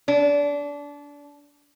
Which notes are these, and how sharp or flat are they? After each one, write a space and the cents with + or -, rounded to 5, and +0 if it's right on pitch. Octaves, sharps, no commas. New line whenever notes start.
D4 -25